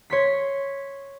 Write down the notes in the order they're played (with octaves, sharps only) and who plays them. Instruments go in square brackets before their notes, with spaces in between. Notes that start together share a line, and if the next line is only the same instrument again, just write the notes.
[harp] C#5 C6 B6